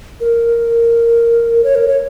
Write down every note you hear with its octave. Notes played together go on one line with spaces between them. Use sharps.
A#4
C#5
A#4
C#5